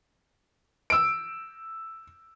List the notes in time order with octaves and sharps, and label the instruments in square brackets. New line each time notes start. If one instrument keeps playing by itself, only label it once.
[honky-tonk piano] E6 D7